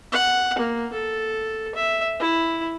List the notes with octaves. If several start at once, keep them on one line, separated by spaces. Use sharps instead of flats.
F#5
A#3
A4
E5
E4